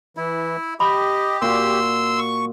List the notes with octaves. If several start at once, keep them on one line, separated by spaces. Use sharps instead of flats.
E3 E4
G4 D#5 B5
A#2 F#4 C6 E6
C#6